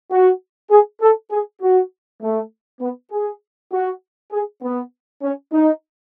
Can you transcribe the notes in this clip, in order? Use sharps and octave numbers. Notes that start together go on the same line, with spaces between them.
F#4
G#4
A4
G#4
F#4
A3
B3
G#4
F#4
G#4
B3
C#4
D#4